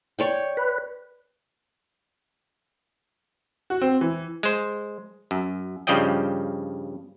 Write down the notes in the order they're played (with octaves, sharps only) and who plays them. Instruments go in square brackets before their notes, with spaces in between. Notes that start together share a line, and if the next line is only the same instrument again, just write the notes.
[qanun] C#5 D5 G5
[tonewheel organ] B4
[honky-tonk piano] F#4
C4
E3
[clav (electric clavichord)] G#3 C5
F#2
G2 C#3 F3 D5 D#5 G5